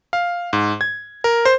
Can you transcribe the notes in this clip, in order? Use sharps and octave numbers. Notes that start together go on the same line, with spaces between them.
F5
G#2
G#6
A#4
C5